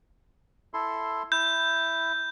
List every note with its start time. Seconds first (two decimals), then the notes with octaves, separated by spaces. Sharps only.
0.74 E4 A4 C6
1.32 E4 G6